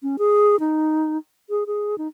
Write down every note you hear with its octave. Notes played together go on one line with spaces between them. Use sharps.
C#4
G#4
D#4
G#4
G#4
D#4